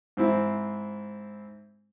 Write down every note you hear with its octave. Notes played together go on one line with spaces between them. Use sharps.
G#2 C4 E4